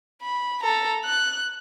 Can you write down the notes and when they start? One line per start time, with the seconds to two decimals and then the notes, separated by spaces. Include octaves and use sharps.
0.22 B5
0.63 A4 A#5
1.05 F#6